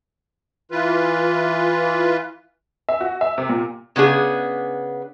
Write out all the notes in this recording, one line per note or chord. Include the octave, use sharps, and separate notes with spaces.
E3 F4 B4
E5
F#4
E5
C3
A#2
C#3 B3 D4 G#4